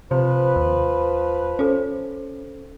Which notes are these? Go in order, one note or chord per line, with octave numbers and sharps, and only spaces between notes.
C3 F3 B4 C5
D#2
C#4 A4 C5